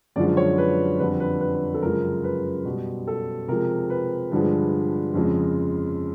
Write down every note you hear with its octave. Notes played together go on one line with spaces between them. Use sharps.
F#2 D3 F3 G#3 D5
C#5
B4
F2 D3 G3 B4
B4
B4
A4
F#2 C#3 F3 G#3 A#4
B4
B2 G3
A4
C3 F3 G#3 A#4
B4
G2 D3 F3 G#3
F2 C#3 F3 G#3